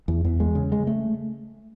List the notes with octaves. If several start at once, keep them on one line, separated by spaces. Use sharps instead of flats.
E2
E2
G#3
C#3
G#3
A3